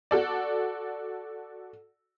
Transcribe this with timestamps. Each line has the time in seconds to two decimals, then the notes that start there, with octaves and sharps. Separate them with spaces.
0.11 F#4 A4 D5